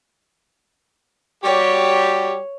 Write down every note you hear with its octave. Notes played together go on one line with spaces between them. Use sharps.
G3 F#4 G4 C#5